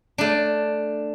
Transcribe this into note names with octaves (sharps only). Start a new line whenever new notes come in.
A3 D4